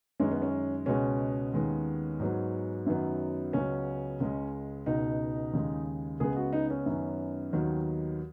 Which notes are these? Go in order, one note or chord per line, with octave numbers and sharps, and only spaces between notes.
F#2 D#3 G#3 B3 C#4
B3
C#4
C#2 B2 G#3 B3 C#4
D#2 D#3 G#3 B3
G#2 F#3 B3
F#2 D#3 F#3 B3
C#2 C#3 F#3 B3 C#4
C#2 C#3 G#3
C#2 B2 B3 D#4
D#2 C#3 G#3
C#2 C#3 G#3 B3 G#4
F#4
D#4
C#4
F#2 D#3 B3
D#2 D#3 F#3 B3